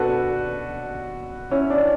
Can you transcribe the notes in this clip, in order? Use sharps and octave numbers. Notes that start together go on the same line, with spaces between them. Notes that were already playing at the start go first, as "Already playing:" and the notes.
Already playing: B2 D4 F#4 A4 B4
C#4 E4
D4